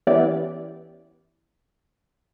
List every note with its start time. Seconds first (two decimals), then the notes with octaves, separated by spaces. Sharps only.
0.07 E3 B3 C#4 E4 G4 D5